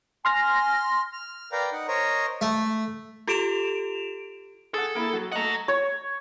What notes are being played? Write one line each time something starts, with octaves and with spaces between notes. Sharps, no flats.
G#5 C6 F6 A#6
F6
A#4 B4 D5 F5 G5 A#5
D#4 F#5
A#4 C5 C#5 D#5 A#5
A3
F4 G4 A4 D7 E7 F7
G#4 A4 F#5
A#3 E4 G#4
F#3
A3 D#5 F#5 A#5
C#5